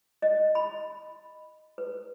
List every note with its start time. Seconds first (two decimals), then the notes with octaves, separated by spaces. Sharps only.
0.22 D#5
0.55 B5
1.78 B4